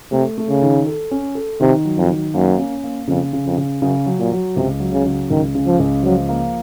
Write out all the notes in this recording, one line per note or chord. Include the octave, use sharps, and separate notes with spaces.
C3 A3
A3
C#3
D#3
A4
C#4
A4
C3 D#3
F#3
F2
D#3
F#2 A#3
C#4
A#3
F2 C#3
C#3
F2
C#3
F#2 C#3
F#3
A#2
F#3
C#2 C3
F#3
C#3
C#3
C#2 D#3
C#3
F3
C#2
F3 F#3
A#3